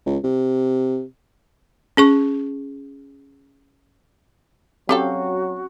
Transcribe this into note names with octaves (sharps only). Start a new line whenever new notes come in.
C#2
C3
C#4 G#4 C#6
F#3 C4 C#4 F#4 G4 A4 F5